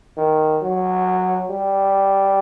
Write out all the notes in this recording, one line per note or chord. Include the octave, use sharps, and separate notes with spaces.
D#3
F#3
G3